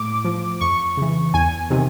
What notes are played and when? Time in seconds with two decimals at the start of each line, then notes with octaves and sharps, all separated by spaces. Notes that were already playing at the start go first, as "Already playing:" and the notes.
Already playing: A2 D6
0.24 F3
0.61 F2 C#6
0.97 C#3 E3
1.34 E2 G#5
1.70 C3 D#3